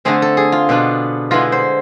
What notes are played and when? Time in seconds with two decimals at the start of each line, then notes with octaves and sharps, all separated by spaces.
0.05 D3 A3 C4 G#4
0.22 A4
0.37 G#4
0.52 F4
0.69 B2 B3 D4 F4
1.31 D3 G#3 B3 E4 F4
1.52 C5